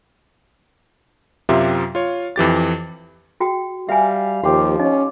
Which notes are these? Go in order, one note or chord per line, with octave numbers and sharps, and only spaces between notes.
F#2 C3 F4 G4 E5
F4 C#5
F2 E3 G4 A6
F#4 G#4 G5
G3 E5 F5 G5 G#5
D#2 F3 G4 C6
C#4 D#4 D#5